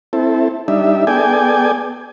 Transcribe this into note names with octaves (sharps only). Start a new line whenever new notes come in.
C4 E4 A4
G3 D4 D#4 E5
B3 G#4 A4 D5 G5 G#5